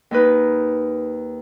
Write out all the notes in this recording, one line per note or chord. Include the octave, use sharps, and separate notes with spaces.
D#2 D#4 B4